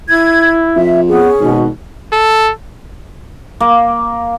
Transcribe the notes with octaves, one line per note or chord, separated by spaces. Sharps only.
E4 G#6
F2 E5
B3 C#4 G#4
G#1 B2
A4
A#3